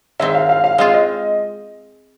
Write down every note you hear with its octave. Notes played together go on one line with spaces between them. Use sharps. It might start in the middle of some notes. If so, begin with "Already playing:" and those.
D#3 G#3 C4 E5
F5
F5
F5
G#3 C4 F4 F5
D#5